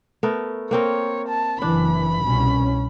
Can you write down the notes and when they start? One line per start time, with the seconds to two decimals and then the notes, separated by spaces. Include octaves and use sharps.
0.23 A3 B3 A#4
0.71 A#3 C4 A#4 C#5
1.28 A5
1.62 F#1 E3 D4 B5
2.23 C2 B2 C#4